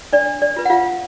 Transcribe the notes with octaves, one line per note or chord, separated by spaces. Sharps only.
D4 D5
D5
F4 B4
F#5
F4 F5